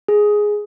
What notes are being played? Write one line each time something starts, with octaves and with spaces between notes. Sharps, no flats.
G#4